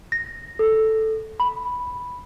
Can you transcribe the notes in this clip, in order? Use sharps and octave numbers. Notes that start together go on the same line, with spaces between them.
A#6
A4
B5